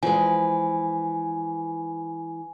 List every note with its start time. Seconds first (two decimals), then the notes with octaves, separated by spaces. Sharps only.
0.03 E3 F3 G#3 G#5